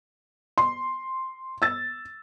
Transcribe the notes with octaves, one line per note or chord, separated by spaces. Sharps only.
C6
E6 A6